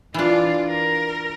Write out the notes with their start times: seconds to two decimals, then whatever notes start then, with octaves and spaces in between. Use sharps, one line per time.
0.14 E3 D4 F4 D5
0.68 A#4